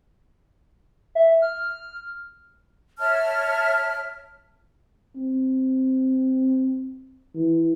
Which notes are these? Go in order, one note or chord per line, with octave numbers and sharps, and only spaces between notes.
E5
F6
C#5 E5 A5 F6
C4
E3